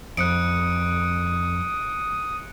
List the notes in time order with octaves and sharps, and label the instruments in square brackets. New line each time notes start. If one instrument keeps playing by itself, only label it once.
[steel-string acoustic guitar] F2 [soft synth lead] D#6 [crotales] F#6 C#7 D7